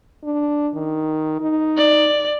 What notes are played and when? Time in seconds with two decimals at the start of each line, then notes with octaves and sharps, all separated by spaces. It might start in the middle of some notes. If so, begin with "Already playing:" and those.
0.24 D4
0.74 D#3
1.41 D#4
1.78 D5